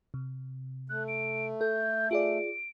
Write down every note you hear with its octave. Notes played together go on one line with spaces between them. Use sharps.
C3
A3 F#6
D7
A4 G6
F4 G#4 D5 D7